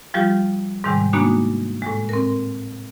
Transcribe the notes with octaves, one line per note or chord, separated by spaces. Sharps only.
F3 G3 F4 G4
G#2 C3 D#3 G3 G#3
G#3 A#3 B3 D4 D#4 F#4
A2 G#3
C4 A#4